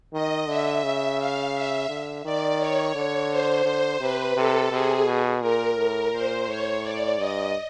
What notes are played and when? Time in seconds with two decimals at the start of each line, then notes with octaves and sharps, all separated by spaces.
0.13 D#3 D#5
0.48 D3 E5
0.84 C#3
1.19 F5
1.54 E5
1.89 D3
2.25 D#3 D5
2.59 C#5
2.95 D3 C#5
3.30 C5
3.65 D3 C5
4.00 C3 B4
4.36 C3 A4
4.71 C3 G#4
5.06 B2
5.41 A#2 A#4
5.77 A2 A#4
6.12 A#2 C5
6.48 A2 C#5
6.82 D5
7.18 G2 D#5